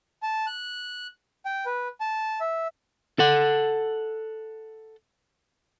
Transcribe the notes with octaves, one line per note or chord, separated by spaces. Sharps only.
A5
F#6
G5
B4
A5
E5
A4 F#5